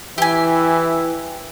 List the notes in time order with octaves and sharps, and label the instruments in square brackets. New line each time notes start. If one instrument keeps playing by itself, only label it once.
[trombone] E3 [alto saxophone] E4 [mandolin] G4 G#5